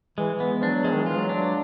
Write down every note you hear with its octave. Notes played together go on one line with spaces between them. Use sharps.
E3 G#3
E3
B3
F3 D4
F#3
F3 G#3
D#3
E3 F4
F#3
D4
F#3